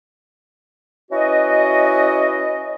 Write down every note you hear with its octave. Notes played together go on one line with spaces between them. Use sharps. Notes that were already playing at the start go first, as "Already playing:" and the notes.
C#4 E4 F#4 B4 D#5